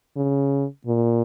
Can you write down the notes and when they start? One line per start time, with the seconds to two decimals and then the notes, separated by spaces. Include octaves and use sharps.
0.17 C#3
0.87 A#2